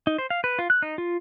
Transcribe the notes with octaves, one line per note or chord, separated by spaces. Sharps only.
D#4
C5
F5
B4
F4
F#6
D#4
F4